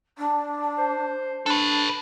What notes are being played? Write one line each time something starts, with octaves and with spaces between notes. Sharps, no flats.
D4
C5
D4 A4 B4